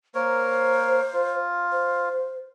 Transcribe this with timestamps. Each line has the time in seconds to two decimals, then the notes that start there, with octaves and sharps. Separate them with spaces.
0.15 A#3 A#4 C5 C#5
1.13 F4
1.72 C5